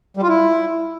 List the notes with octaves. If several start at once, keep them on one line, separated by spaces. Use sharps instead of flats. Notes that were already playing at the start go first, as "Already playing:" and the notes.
G3
F4
E4